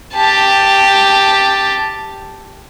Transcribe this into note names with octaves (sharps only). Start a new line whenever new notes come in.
G4 A5